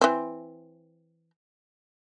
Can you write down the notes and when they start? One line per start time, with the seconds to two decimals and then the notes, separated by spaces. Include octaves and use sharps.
0.01 E3 C4